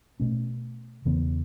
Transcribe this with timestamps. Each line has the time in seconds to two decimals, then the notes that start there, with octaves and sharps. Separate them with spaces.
0.20 B2 A3 C#4
1.05 E2 C#3 E3 B3